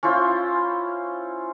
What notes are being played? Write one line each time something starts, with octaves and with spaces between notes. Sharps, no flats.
C#4 E4 F4 C5